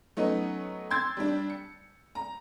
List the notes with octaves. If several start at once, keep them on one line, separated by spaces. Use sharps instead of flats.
F#3 A3 B3 C#4 D#4
C6 E6 G#6 A6
G3 D4
C#7
A#5